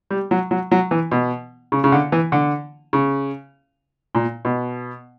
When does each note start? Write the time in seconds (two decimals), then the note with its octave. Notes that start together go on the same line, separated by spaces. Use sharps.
0.11 G3
0.31 F#3
0.51 F#3
0.71 F#3
0.91 E3
1.12 B2
1.72 C#3
1.84 C#3
1.92 D3
2.12 E3
2.32 D3
2.93 C#3
4.15 A#2
4.45 B2